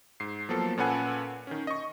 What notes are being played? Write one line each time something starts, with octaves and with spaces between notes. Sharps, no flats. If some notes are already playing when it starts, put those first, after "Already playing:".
G#2 C7
F3 F#3 A#3 B3 A4
A#2 C#4 A4 B4 F#5 G#5
D#3 C#4
D#5 C#6